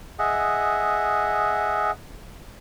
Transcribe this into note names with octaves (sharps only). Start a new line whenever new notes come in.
G#4 D#5 E5 F#5